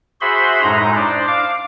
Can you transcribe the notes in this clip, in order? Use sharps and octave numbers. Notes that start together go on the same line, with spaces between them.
F#4 G#4 C5 E5 B5 C6
F#2 A2 G#3 D#4 A#5
D4 C5 D5
F5 D6